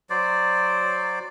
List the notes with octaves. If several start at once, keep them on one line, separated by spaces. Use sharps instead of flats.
F#3 C5 D5